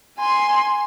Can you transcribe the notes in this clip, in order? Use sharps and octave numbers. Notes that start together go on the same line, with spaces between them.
G#5 C6